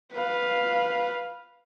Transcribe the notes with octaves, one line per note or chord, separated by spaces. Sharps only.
B4 F5